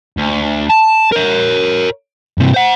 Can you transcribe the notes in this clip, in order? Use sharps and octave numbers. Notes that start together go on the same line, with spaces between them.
D2
A5
A#4 C#5
G2 C3
C5 F#5